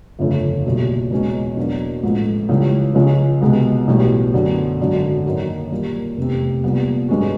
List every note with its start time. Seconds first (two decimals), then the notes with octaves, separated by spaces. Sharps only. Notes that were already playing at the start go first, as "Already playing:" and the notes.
0.19 G1 F2 C#3 F3 A3
0.66 B1 A#2 G3
1.11 E2 B2 G#3 C#4
1.57 E2 B2 F#3 A#3 D4
2.03 A1 G#2 F3 A3
2.49 C#2 C#3 E3 G3
2.95 C#2 C#3 F3 G#3 C#4
3.42 C2 B2 G#3 B3
3.87 B1 A2 E3 G3 B3
4.34 F#2 D3 F#3 B3
4.79 G#1 F#2 D3 F#3
5.26 F#2 D#3 F#3 A#3
5.71 A#2 G3 A#3
6.17 F1 E2 C3
6.64 C2 A#2 G3 B3
7.09 G2 D#3 G#3 C#4 F#4